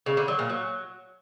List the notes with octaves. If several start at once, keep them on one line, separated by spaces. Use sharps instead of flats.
C#3
D3
F#3
A#2
F#3